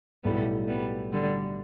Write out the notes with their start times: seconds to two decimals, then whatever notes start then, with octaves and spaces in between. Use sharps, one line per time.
0.24 B1 A2 G3 A3 B3 E4
0.68 G3 B3
1.12 D3 G3